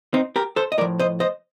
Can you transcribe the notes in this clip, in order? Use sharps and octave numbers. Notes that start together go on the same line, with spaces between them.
C4 D#4
G4 A#4
A4 C5
D#5
A2 F3 A#4 D5
C5 D#5
C5 D#5